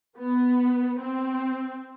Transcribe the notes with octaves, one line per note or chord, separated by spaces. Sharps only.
B3
C4